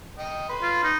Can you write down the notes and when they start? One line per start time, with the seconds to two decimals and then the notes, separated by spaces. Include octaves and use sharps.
0.19 D#5 G5
0.49 B4 B5 C6
0.62 F4
0.84 D#4